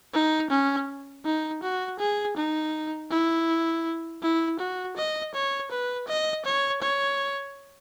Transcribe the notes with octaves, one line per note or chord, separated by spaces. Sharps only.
D#4
C#4
D#4
F#4
G#4
D#4
E4
E4
F#4
D#5
C#5
B4
D#5
C#5
C#5